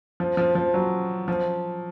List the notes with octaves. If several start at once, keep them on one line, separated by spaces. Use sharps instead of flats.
F3
F3
F3
F#3
F3